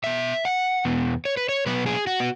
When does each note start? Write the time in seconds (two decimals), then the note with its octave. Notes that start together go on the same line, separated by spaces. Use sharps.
0.04 B2 B3 E5
0.45 F#5
0.85 E2 B2 B3
1.25 C#5
1.37 B4
1.49 C#5
1.66 B2 F#3 B3 B4
1.86 G#4
2.07 F#4
2.20 B3